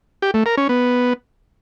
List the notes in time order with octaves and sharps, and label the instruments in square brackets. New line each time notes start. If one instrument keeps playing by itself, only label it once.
[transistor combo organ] G4
A3
A#4
C#4
B3